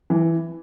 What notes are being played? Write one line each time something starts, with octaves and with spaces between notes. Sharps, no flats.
E3